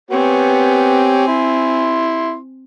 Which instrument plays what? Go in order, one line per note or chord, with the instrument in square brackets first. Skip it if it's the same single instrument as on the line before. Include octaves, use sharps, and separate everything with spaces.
[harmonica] B3 G4 C#5 [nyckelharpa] C4 G#5
[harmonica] E4 C6